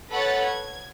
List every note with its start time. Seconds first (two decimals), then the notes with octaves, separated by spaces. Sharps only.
0.11 A4 B4 C#5 F#5 B5 A6
0.45 G#6